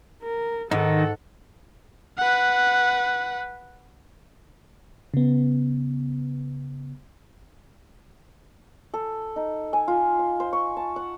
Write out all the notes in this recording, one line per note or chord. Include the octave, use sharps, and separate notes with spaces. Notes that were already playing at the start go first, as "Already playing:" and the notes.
A#4
G#2 D#3 D#4 A4 F#5
B4 F#5
C#3 B3
A4
D#4
G#5
F4
C6
C5
C#6
A5
F#5